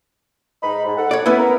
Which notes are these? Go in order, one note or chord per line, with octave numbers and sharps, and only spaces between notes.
G#2 D#4 B5
G#2
A4 F#5
C#5 D5
B3 C#4 E4 B4
A#4